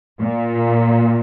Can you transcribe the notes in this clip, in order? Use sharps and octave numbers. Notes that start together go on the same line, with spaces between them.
A#2